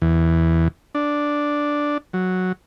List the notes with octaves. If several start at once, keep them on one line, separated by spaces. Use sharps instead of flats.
E2
D4
F#3